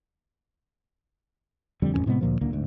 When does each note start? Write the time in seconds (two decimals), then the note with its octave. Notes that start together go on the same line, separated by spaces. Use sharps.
1.82 D#1 F2 D3 G3
1.94 A1 F2 D#3 C#4
2.06 A2 C3 G#3 B3
2.21 D2 A#2 F3
2.41 D1 C#2 D3 A#3
2.52 D1 D2 G#2